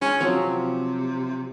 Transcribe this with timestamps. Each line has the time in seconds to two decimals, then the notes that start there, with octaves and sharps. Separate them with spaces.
0.01 G#3 C#4
0.20 F3 F#3 C4
0.37 C3